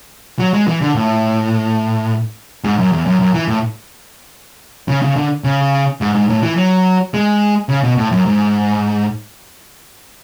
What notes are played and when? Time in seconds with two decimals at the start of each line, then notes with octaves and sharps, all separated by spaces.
0.39 F#3
0.54 G#3
0.68 E3
0.81 D3
0.95 A2
2.64 G#2
2.79 F#2
2.92 E2
3.06 F#2
3.20 F#2
3.34 E3
3.48 A2
4.88 C#3
5.02 C#3
5.16 D3
5.44 C#3
6.01 G#2
6.15 G#2
6.30 A2
6.42 E3
6.57 F#3
7.14 G#3
7.69 C#3
7.83 B2
7.98 A2
8.12 F#2
8.26 G#2